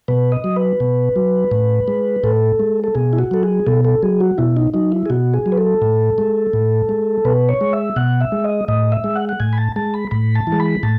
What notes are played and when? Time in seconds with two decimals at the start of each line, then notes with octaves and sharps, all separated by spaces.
0.08 B2 B4
0.32 D#5
0.44 F#3
0.56 B4
0.80 B2
1.16 F#3
1.51 A2
1.88 G#3
2.24 A2 A4
2.59 G#3
2.84 A4
2.95 B2 G#4
3.13 E4
3.19 F#4
3.31 F#3 A4
3.43 G#4
3.67 B2 A4
3.85 A4
4.03 F#3 G#4
4.20 F#4
4.38 B2 E4
4.57 D#4
4.74 F#3 D#4
4.92 E4
5.06 G#4
5.10 B2 F#4
5.34 G#4
5.46 F#3
5.52 B4
5.58 A4
5.82 A2
6.18 G#3
6.53 A2
6.89 G#3
7.25 B2 B4
7.49 C#5
7.61 G#3
7.73 E5
7.96 B2 F#5
8.21 E5
8.32 G#3
8.44 D#5
8.68 A2 D#5
8.92 E5
9.04 G#3
9.16 F#5
9.29 F#5
9.40 A2 G#5
9.53 B5
9.58 A5
9.76 G#3 A5
9.94 B5
10.11 A2 B5
10.35 A5
10.47 E3
10.52 G#3
10.60 B5
10.83 A2 A5